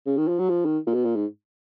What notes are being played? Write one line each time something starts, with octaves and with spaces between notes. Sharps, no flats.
C#3
D#3
F3
F#3
F3
D#3
A#2
B2
A#2
G#2